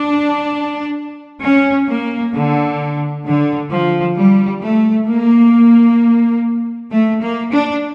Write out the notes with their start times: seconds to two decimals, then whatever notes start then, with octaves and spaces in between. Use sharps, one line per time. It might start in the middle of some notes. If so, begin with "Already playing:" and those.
Already playing: D4
1.42 C#4
1.89 A#3
2.34 D3
3.25 D3
3.72 F3
4.17 G3
4.62 A3
5.08 A#3
6.91 A3
7.21 A#3
7.52 D4